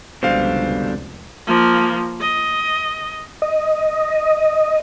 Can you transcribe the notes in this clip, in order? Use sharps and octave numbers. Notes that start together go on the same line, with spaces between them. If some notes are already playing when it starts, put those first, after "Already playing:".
F1 C#2 B2 D3 G3 C5 F5
F3 A#3
D#5
D#5